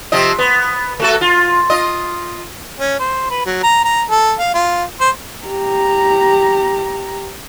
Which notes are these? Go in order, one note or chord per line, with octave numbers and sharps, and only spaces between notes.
C3 F3 D#5
B3
A3 F#4 A4
F4
F4 D#5
C#4
C5
B4
F#3
A#5
A#5
A4
F5
F4
C5
G4 A#5